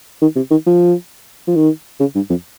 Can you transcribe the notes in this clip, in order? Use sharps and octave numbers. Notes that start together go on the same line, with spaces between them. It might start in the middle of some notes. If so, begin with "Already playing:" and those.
D#3
C3
D#3
F3
F3
D#3
C#3
G2
F2